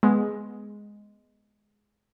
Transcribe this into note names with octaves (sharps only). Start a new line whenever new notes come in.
G#3 B3